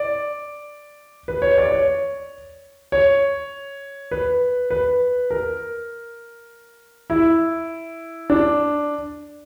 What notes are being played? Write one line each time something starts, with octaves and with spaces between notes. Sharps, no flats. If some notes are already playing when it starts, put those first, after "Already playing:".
Already playing: D5
B4
C#5
D5
C#5
C#5
B4
B4
A#4
E4
D4